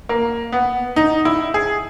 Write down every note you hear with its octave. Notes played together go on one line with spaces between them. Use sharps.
A#3
B3
D#4
E4
G#4